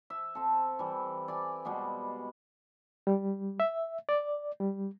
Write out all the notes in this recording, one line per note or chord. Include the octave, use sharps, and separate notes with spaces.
E5
C4 A4
E3 G3
D5 G#5
B2 G3 G#3 B3
G3
E5
D5
G3